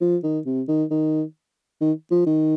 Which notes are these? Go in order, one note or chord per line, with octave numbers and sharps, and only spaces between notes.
F3
D#3
C3
D#3
D#3
D#3
F3
D#3